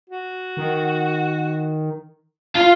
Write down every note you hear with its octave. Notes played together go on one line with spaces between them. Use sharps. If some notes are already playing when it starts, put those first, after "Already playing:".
F#4
D#3
F4 F5